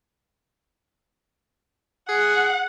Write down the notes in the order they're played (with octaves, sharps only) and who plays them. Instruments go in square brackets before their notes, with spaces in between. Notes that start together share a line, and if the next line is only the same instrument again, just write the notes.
[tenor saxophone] G#4 [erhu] F#5